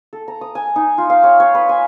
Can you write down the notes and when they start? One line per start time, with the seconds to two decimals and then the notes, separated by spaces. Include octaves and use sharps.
0.13 A4
0.28 A#5
0.41 D#6
0.55 G#5
0.76 D#4
0.98 F4
1.10 F5
1.24 C#5
1.40 C#5
1.55 B4
1.69 G#5